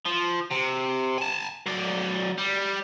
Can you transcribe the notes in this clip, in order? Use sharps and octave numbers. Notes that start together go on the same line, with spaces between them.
F3
C3
G#5 A5
F#3 D5
G3